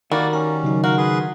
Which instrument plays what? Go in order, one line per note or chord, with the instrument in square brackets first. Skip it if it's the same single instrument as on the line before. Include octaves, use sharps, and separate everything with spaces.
[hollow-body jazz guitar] D#3 [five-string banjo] G3 F#4 A#4 [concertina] A#3 D5
[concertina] C#4 [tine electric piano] A#5
[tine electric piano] C#3 F#3 D#4
[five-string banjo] F#4 [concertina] A#4 F5
[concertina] G#4 B4 C6